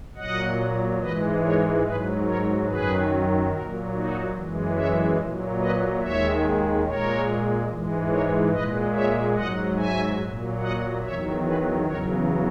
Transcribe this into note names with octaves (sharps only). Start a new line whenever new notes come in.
A#2 F#3 D#5 F#5
G#2 E3 G#3 B4 D#5
A#4 C#5
G#2 F#3 G#4 B4
A#4 C#5
F#2 D#3 F#3 G#4 B4
A#2 F#3 F#4 A#4
D#4 F#4
F#2 E3 G#3
C#5 E5
A#2 F#3
B4 D#5
D#2 D#3 G#3 C#5 E5
A#2 G#3 A#4 C#5
G#2 E3 G#3
A#4 C#5
A#2 G#3 B4 D#5
C#5 E5
G#2 F#3 D#5 F#5
E5 G#5
A#2 F#3
D#5 F#5
E2 D#3 F#3 C#5 E5
G#4 B4
E2 C#3 F#3 A#4 C#5